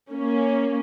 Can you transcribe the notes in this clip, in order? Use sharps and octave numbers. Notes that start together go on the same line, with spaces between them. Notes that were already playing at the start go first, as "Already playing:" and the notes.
A#3 C#4